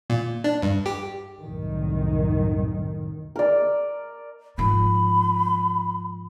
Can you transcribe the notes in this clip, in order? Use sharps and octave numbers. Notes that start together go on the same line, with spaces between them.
A#2
D4
G2
G4
C2 F#2 A2 D#3
A#4 D5
G#2 F3 B5